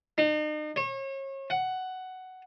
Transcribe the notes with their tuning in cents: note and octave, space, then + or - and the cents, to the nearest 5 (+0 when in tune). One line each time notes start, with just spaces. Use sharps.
D#4 -40
C#5 -35
F#5 +10